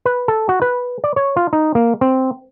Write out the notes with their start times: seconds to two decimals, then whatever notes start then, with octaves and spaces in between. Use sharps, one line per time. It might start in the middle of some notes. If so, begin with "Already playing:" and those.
0.05 B4
0.28 A4
0.49 F#4
0.62 B4
1.04 D5
1.16 C#5
1.37 F4
1.53 D#4
1.75 A#3
2.01 C4